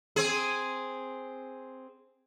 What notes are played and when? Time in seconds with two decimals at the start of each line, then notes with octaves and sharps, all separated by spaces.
0.16 C4 G#4